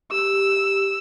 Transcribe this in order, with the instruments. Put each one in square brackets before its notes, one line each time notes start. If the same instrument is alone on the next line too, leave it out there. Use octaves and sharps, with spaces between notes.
[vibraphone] G4 [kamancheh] E6